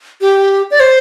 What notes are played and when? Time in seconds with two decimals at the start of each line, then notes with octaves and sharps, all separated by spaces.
0.21 G4
0.71 D5
0.80 C5